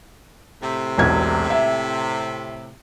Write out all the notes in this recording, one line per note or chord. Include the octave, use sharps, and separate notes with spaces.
A2 C3
E1 B1 G#6
E5